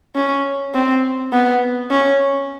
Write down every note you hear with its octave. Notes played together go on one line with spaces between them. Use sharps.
C#4
C4
B3
C#4